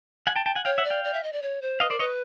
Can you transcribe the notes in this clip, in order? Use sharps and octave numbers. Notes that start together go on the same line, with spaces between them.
F#5 G#5
G5 A5
G5 A5
F#5 G#5
C#5 F5 G5
E5 F#5
D5
F5 G5
D5
E5
D#5
D5
C#5
C5
B4 D#5 F5
A#4 C5 D5
B4 C#5 D#5